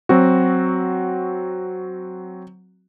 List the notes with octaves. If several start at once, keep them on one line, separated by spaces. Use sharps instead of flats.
F#3 C4 F#4